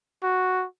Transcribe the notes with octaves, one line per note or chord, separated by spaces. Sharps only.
F#4